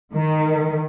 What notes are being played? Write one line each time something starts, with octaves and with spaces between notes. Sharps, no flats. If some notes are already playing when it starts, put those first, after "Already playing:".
D#3